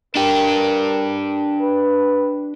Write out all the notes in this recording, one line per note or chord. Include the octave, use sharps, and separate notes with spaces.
D4 G4 A#4
B4